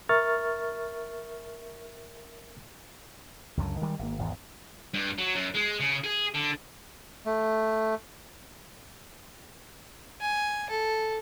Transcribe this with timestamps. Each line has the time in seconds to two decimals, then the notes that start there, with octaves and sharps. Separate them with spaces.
0.09 A#4 E5 C#6 F6 A6
3.57 C#2 F#2 D3
3.81 D#3 G3 G#3
3.99 G#1 B2 A#3
4.19 G#1 E2 G#2
4.94 G2
5.18 F#3
5.35 F#2
5.55 G#3
5.80 C#3
6.04 G#4
6.35 D3
7.26 A3
10.21 G#5
10.70 A4